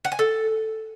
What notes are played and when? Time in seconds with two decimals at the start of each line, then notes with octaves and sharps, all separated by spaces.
0.05 F#5
0.12 G#5
0.19 A4